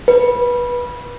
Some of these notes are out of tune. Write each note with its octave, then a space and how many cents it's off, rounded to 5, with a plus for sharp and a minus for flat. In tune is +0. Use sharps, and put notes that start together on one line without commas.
B4 -20